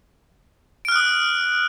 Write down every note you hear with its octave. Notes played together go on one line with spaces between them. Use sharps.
D#6 F6 F#6 D7